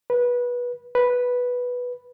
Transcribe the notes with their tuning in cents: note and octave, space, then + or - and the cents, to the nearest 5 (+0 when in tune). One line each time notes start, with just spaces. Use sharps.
B4 -20
B4 -5